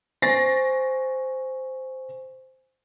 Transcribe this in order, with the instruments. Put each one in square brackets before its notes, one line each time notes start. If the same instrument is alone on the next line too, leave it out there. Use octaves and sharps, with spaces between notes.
[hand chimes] C5 G#5 C#6 [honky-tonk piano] A6 A#6 C7